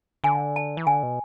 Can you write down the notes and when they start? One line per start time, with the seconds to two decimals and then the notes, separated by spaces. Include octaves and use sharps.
0.24 D3 G#5
0.56 A5
0.77 E3
0.86 D3 G#5
1.03 B2